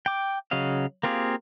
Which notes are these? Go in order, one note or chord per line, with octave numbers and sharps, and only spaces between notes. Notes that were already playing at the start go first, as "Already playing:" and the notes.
G5 D6
C#3 F#3 D#5 F5
A#3 C4 F4 G4 G#4